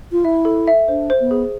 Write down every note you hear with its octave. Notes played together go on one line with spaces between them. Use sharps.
F4
E4 E5
A4
E5
D4 C5
C5
B3
G#4